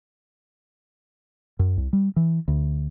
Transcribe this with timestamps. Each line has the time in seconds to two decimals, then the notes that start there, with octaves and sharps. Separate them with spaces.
1.59 F#2
1.77 C2
1.93 G3
2.16 E3
2.48 D2